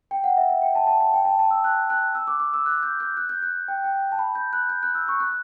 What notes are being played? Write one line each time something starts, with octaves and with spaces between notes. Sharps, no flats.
G5
F#5
E5
E5
G5
A5
A5
A5
G5
A5
A5
E6
F#6
F#6
E6
D6
D6
E6
F#6
G6
G6
F#6
G6
F#6
G5
G5
A5
B5
G6
F#6
G6
F#6
E6
C#6
F#6